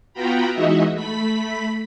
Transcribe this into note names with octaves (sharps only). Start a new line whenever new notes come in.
B3 F4 F#4 G5 A#5 B5
E3 G#3 D#4 F#4 D#5 E5
A3 B5 B6